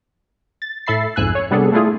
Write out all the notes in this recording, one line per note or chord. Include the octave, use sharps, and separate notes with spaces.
A6
A2 A4 E5 B5 A6 C7
B1 F2 G#2 G#5 E6 F#6
C#5
C3 G3 B3 D4 G#4 A4
A3 D4 E4 F4 G#4